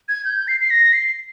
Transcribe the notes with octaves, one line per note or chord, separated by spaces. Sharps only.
G#6
G6
C7
C7
A#6
C7